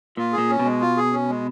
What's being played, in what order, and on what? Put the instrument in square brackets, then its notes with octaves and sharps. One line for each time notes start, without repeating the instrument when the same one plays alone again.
[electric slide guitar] A#2 [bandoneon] F4
[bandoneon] G#4
[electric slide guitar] A#2
[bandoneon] C#4
[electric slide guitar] B2 [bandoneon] G#3
[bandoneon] F4
G#4
C#4
G#3